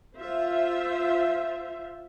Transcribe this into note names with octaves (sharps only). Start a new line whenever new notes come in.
F4 C5 E5